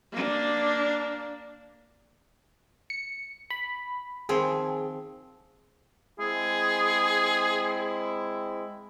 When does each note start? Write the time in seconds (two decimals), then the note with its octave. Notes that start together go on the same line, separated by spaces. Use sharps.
0.12 A#3 D4
2.90 C#7
3.50 B5
4.29 D#3 F3 C4 G#4
6.19 G#3 C4 E4 G#4